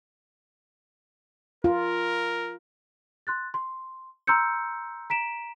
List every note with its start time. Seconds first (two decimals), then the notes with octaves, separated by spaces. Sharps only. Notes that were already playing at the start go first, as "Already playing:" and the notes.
1.64 F4 A#4
3.27 C6 F#6 A6
3.54 C6
4.27 A#5 C6 E6 F6 G6 C#7
5.10 A#5 B6 D7 E7